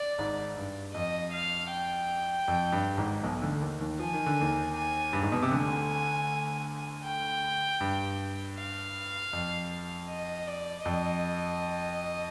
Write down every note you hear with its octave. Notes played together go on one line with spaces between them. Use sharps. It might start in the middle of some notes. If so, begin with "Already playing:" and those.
Already playing: D5
G#1 G#2
G2
F2 D#5
F5
G5
F2
G2
G#1 G#2
B1 B2
D2 D3
D#2 D#3
D#2 D#3
F3 G#5
D#3
D3
D#2 D#3
G#5
G2
G#2
B2
C3
D2 D3 G#5
G5
G2
F5
F2
D#5
D5
F2 D#5